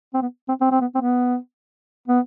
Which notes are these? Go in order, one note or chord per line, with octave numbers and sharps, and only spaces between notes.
C4
B3
C4
C4
C4
B3
C4
B3
B3